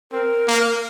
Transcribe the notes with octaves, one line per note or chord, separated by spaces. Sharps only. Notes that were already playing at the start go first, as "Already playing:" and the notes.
C4 A#4
A#3